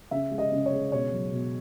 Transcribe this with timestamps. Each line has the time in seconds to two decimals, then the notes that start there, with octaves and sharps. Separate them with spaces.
0.11 C#3 E5
0.31 G#3
0.38 D#5
0.52 C#3
0.66 C#5
0.72 G#3
0.92 B2 C#5
1.12 F#3
1.33 B2